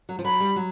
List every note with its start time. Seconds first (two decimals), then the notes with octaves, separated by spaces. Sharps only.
0.09 F#3
0.19 F3
0.24 F#3 B5
0.40 G3
0.56 F#3